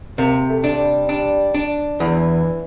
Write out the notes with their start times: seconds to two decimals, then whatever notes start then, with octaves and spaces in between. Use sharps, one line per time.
0.18 C3 A#3
0.49 A3
0.64 D4
0.79 G3
1.09 D4
1.54 D4
2.00 E2 E3